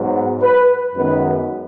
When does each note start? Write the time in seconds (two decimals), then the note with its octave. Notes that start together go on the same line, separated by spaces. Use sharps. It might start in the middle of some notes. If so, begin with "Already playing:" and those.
Already playing: G#2 F#3 B3
0.42 B4
0.95 F#2 D#3 G#3 B3 B4